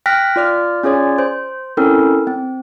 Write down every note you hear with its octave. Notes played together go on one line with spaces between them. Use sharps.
G5 F6 F#6 A#6 B6
F4 D5 F6
C#4 F4 G#4 C#5 D5
C5
C4 C#4 E4 A4 A#4
C4